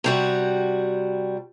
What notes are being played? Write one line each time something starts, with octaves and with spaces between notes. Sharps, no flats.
C3 G3 F#4